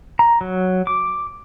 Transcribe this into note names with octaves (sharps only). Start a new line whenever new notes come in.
A#5
F#3
D6